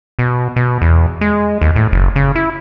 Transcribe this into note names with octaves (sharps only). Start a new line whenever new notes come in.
B2
B2
E2
G#3
D#2
A2
F#1
C#3
E4